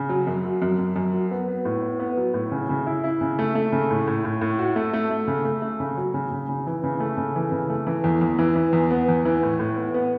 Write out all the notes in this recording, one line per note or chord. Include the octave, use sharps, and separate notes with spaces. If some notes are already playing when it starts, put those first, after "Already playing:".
Already playing: C#3
F#3
F#2
F#3
F#2
F#2
F#2
F#3
B3
B3
A2
B3
B3
F#3
A2
C#3
C#3
E4
E4
C#3
A3
A3
C#3
A2
A2
A2
A2
F#4
A3
A3
A3
C#3
A3
A3
C#3
F#3
C#3
C#3
C#3
E3
C#3
A3
C#3
E3
C#3
A3
E3
E2
E2
E3
E3
E2
B3
E2
E3
A2
A2
B3
B3